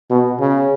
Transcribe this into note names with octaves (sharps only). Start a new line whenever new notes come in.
B2
C#3